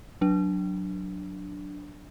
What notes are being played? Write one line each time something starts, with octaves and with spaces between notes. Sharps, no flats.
F#3 D4